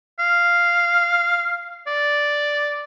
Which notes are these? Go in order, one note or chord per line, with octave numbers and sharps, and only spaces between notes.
F5
D5